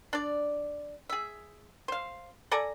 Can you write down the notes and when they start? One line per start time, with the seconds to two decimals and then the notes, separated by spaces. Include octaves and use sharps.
0.13 D4 D5
1.09 G#4 E5
1.88 C5 F5
2.51 A4 D5 G#5 A#5